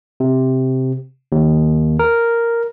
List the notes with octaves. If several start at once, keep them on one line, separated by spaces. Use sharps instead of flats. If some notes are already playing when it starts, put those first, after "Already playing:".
C3
D#2
A#4